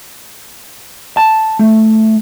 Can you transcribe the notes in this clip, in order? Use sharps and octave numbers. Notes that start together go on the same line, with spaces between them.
A5
A3